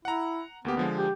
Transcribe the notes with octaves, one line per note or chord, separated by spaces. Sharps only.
E4 F#5 A#5
D2 A#3 B3 G4
D3 F3 G#3
G4